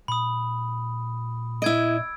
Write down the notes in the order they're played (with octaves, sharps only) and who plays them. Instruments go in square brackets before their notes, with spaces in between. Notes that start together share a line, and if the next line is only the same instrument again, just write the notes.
[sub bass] A#2 [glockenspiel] B5 D#6
[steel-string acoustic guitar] E4 D#5 [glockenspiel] E6 G#6 D7